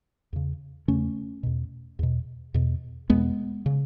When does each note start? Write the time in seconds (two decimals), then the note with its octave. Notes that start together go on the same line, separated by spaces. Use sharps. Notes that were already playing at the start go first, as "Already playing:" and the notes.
0.33 E2 C#3
0.88 E2 C#3 A3 C#4
1.43 E2 B2
1.99 E2 B2
2.54 E2 B2
3.10 E2 B2 G#3 B3
3.66 C#3